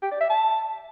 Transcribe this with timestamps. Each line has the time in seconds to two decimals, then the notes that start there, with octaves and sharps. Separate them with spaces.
0.02 G4
0.11 D5
0.21 E5
0.30 A5